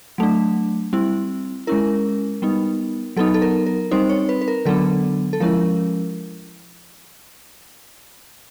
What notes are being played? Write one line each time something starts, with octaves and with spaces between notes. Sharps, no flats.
F#3 A3 D4
G3 C4 E4
G#3 C#4 E4 A#4
G3 B3 D#4
F#3 B3 D#4 A4
A4
A#4
A#4
G3 C4 D#4 C5
C#5
B4
B4
A#4
D3 F#3 B3 D4 A4
A4
F3 G#3 C#4 E4 A#4